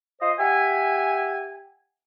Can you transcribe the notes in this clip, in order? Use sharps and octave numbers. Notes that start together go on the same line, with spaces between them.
F4 C5 D#5
G4 E5 F#5 G#5